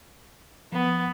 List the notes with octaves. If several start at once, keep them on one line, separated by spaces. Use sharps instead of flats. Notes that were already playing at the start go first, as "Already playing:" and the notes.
F3 B3